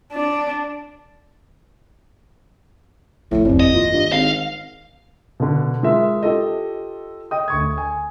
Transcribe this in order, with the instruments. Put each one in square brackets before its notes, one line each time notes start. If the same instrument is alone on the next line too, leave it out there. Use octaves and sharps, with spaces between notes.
[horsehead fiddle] D4
[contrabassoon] A2 [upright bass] F3 A3
[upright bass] G1 F2 [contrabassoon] C2
[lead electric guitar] D#5
[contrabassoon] A#2 [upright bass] D#3
[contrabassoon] G2
[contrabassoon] G#1 [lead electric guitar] F5
[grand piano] B2 D3
G#3 F4 A#4 E5
F4 G4 A4 D#5
D#5 G5 D#6
D2 C#6 G#6
G#5